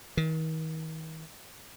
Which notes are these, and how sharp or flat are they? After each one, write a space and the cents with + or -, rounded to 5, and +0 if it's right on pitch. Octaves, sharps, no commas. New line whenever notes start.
D#3 +40